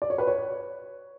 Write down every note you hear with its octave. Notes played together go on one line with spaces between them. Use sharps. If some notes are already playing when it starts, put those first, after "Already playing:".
D5
C#5
B4
C#5